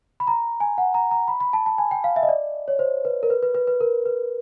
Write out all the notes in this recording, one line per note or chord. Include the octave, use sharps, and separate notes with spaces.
B5
A#5
G#5
F#5
A#5
A#5
B5
B5
A5
A5
G#5
G5
F5
E5
D#5
D5
C#5
C5
B4
A#4
B4
B4
B4
B4
A#4
B4